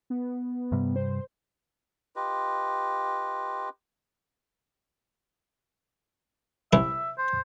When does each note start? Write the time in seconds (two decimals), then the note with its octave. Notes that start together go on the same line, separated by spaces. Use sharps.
0.10 B3
0.72 G2 C3 G3
0.96 C5
2.16 F4 G4 B4 D#5
6.73 C2 E4 E5
7.18 C5